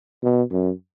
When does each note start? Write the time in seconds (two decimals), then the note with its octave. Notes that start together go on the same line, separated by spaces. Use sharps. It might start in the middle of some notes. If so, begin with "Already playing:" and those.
0.23 B2
0.51 F#2